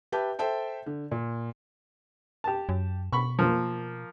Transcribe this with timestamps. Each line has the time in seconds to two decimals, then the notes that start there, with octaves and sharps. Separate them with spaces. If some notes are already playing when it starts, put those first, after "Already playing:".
0.12 G4 B4 E5 A5 G6
0.39 A4 C5 E5 G5 A5
0.86 D3
1.11 A#2
2.44 G4 A5
2.69 F#2
3.13 B2 B5 C#6
3.39 F3 A#3